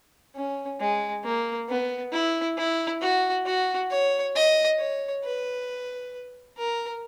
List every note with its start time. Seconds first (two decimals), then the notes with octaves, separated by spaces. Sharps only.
0.36 C#4
0.80 G#3
1.24 A#3
1.69 B3
2.12 E4
2.57 E4
3.01 F#4
3.46 F#4
3.90 C#5
4.35 D#5
4.79 C#5
5.24 B4
6.57 A#4